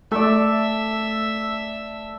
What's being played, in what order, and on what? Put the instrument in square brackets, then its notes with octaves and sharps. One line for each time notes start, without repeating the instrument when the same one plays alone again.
[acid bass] A3 [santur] A4 D5 [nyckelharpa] E5